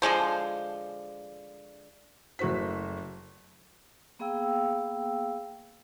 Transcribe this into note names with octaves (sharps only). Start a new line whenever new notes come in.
D3 F3 G#3 C5
F#1 A3 F#4 C5 B6
A#3 B3 G#4 F5 G5 E6